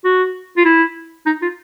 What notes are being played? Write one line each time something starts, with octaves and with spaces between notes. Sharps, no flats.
F#4
F4
E4
D#4
F4